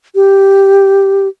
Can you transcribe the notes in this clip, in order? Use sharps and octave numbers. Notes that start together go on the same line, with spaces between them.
G4